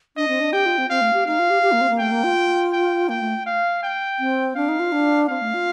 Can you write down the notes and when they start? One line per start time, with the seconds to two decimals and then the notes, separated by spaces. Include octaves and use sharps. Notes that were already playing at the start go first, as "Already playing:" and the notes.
0.17 D4 D#5
0.28 C4
0.40 D4
0.53 G4 G5
0.66 F4
0.78 C4
0.90 C4 F5
1.01 A3
1.14 G4
1.26 D#4 F5
1.39 F4
1.50 G4
1.62 G4
1.72 A#3
1.81 C4
1.90 A#3
1.99 A3 G5
2.12 A#3
2.24 F4
2.73 G5
3.09 A#3 G5
3.21 A3
3.46 F5
3.83 G5
4.19 C4
4.56 D4 F5
4.69 D#4
4.80 F4
4.92 D4
5.29 C4 F5
5.42 A3
5.54 F4